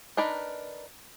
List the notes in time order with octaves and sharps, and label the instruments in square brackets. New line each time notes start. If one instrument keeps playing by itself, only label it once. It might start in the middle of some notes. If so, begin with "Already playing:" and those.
[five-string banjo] D4 D#4 A#4 B4